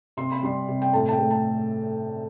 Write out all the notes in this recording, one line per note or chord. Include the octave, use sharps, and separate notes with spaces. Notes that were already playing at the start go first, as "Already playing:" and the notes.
C3 C6
B5
G3 C6
C3
G5
A2 A5
A5
G5
A3
A5